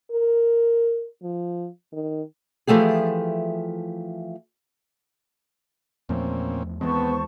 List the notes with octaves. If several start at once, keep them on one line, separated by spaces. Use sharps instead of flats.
A#4
F3
D#3
E3 F3 A3 G4 G#4
E2 A#2 F3 A3 C4 C#4
D#2 E3 G#3 B3 C4 C5 A5 C#6